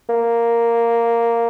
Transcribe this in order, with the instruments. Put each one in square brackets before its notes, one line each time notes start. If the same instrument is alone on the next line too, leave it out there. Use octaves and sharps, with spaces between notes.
[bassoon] A#3